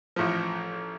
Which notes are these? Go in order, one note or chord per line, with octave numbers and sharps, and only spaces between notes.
A1 A2 F3